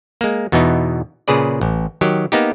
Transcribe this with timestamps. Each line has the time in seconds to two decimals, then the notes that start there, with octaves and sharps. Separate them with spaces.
0.21 G#3 A#3
0.52 E2 B2 E3 B3 D#4
1.28 A#2 C#3 G#4 B4 D5
1.61 A1
2.01 D#3 F#3 G4
2.32 A#3 B3 D#4 G4